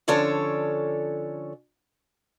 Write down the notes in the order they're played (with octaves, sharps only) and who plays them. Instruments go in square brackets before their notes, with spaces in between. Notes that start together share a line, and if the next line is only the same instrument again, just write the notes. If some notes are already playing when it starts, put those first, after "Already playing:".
[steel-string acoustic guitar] D3 F3 C#4 D4 A4 C#5